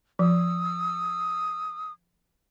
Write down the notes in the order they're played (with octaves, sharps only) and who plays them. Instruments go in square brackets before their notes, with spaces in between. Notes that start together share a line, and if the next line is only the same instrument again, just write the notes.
[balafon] F3 [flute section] D#6 E6